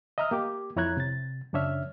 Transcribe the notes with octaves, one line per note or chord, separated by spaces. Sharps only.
D#5 E5 A#5 D#6 F6
A#3 G4 D6
F2 E4 C#5 A#5 F#6 G#6
C3 A6
F#2 C#3 D4 C#5 E5 F6